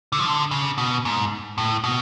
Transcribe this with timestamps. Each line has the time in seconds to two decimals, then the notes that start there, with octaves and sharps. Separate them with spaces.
0.12 D3
0.19 F3
0.25 D3
0.51 C#3
0.78 B2
1.05 G#2
1.58 A2
1.84 B2